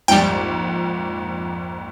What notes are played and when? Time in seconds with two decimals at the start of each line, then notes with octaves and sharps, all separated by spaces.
0.08 A#1 F2 G#2 G3 G5